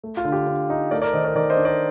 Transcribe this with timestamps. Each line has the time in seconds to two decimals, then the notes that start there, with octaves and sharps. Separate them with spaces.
0.04 A3
0.17 F4
0.25 D3
0.32 G4
0.46 D3
0.70 D#4
0.91 A3 A#4 D5
1.02 A#4 D5
1.13 D#3 C5 D#5
1.24 A#4 D5
1.35 D#3 A#4 D5
1.50 C5 D#5
1.57 D4
1.65 A#4 D5